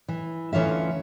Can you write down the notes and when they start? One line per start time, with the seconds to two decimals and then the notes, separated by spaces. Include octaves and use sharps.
0.08 E3
0.53 D2 E3 C#4 F4 E5